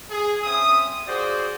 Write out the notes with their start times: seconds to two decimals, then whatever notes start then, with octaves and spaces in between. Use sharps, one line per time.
0.10 G#4
0.43 C4 C#4 E5 D#6
1.07 F4 F#4 G#4 C5 D5